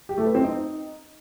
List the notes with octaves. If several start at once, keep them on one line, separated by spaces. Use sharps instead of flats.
G4
A3
B4
C4
D#4